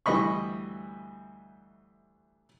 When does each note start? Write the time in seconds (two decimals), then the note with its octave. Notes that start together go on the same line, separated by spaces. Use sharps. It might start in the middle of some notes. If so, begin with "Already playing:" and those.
0.06 D2 E3 G3 D#5 B5 C#6